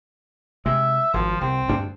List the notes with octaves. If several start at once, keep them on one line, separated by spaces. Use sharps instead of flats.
C3 G#3 E5
G#1 F3
C2 C4
D2 G2 D4